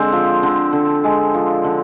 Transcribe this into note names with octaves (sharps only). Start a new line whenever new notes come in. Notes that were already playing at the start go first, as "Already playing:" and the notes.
Already playing: D3 G#3 C4
F3
D3
D3
G#3
F3
D3